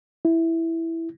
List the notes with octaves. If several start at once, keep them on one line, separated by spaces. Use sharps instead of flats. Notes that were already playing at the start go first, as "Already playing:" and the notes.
E4